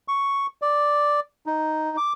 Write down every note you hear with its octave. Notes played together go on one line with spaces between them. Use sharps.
C#6
D5
D#4
D6